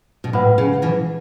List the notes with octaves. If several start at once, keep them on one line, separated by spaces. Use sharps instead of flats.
B2
A2 B4 F#5 B5
C#3
B2 E3